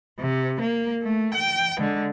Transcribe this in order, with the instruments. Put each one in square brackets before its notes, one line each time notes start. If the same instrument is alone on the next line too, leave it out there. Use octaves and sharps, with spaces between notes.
[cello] C3
A#3
A3
G5
D3 G#3